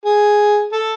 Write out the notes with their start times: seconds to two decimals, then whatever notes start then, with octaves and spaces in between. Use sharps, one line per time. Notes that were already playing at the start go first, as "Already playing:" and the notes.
0.05 G#4
0.72 A4